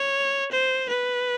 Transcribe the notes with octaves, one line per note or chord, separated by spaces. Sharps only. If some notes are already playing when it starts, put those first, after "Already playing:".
Already playing: C#5
C5
B4